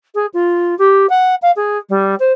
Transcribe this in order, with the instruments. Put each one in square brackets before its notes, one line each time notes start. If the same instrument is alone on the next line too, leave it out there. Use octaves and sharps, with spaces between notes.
[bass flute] G#4
F4
G4
F#5
F5
G#4
G3
C5